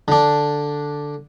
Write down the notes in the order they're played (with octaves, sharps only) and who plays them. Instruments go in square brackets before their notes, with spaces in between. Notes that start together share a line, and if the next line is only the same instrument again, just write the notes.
[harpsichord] D3 D4